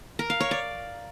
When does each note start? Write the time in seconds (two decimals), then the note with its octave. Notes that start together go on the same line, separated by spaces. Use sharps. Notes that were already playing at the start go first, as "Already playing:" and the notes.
0.19 A#4
0.30 F5
0.40 C#5
0.51 D5